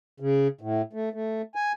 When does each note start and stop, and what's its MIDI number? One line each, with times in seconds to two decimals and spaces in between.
0.20 0.48 49
0.61 0.82 45
0.93 1.09 57
1.13 1.42 57
1.55 1.72 80